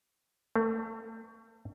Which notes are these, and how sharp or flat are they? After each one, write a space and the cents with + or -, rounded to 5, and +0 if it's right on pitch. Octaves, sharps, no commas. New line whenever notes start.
A3 +35